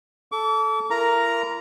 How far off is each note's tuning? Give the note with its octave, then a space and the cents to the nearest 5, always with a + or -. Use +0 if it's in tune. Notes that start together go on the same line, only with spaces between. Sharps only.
A4 -5 D6 -40
E4 +45 A#4 +0 A#5 +5